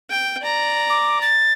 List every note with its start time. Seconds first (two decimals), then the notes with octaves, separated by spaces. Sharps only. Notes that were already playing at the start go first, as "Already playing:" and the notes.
0.10 G5
0.42 D5 A#5
0.90 D6
1.21 A6